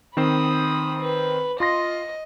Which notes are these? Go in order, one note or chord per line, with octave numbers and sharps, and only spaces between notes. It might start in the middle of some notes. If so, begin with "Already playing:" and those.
D#3 C4 C5 B5 D#6
B4
F4 D#5 C6 A#6